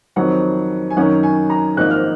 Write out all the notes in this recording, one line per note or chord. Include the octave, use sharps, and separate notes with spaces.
F2 D#3 F#3 C4 F#5
G#5
F#2 D#3 F#3 C#4 F#5
G#5
A#5
G#1 G#2 F3 A#3 D#4 F#6
F6